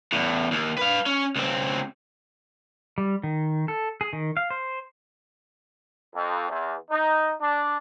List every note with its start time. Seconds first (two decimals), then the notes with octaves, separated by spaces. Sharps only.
0.12 E2 A2
0.51 D#2
0.78 B4 F5
1.06 C#4
1.36 C#2 C4
2.98 G3
3.23 D#3
3.68 A4
4.01 G#4
4.13 D#3
4.37 F5
4.50 C5
6.14 F2
6.49 E2
6.91 D#4
7.41 D4